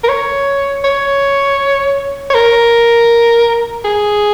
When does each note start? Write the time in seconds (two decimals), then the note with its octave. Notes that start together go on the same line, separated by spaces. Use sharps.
0.04 A#4
0.09 C#5
0.84 C#5
2.30 C#5
2.34 A#4
3.85 G#4